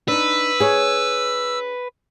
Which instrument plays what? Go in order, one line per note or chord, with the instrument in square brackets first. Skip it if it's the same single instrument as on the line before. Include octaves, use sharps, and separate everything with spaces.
[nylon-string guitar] D4 D#4 [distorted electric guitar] B4 [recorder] E6
[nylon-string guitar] G#4 C#5